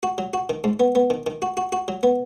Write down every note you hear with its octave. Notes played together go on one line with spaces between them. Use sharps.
F#4
F#3
F#4
D#3
G#2
B3
B3
D#3
D#3
F#4
F#4
F#4
F#3
B3